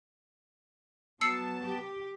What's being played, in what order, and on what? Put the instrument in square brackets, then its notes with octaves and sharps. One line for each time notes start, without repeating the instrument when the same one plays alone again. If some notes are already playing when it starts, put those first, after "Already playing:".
[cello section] F#3 [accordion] B3 A5 [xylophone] E6 C7 C#7
[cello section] G4